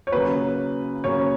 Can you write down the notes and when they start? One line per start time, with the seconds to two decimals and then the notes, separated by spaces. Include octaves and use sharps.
0.07 C#5
0.12 C#3 F#3 A#3 B4
1.04 C#3 F#3 A#3 C#5